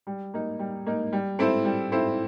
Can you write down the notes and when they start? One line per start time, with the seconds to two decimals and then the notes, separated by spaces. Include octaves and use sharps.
0.07 G3
0.34 A#3 D#4
0.59 G3
0.86 A#3 D#4
1.13 G3
1.39 C4 E4 A4 C5
1.65 G3
1.92 C4 E4 A4 C5